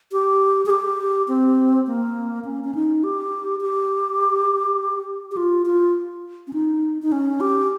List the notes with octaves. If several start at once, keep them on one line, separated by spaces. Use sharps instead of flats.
G4
G#4
G4
C4
A#3
C#4
C#4
D#4
G4
G4
G4
F4
F4
C#4
D#4
D#4
C#4
G4